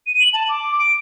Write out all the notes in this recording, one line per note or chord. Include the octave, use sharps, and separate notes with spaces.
D#7
F#7
A5
D6
D7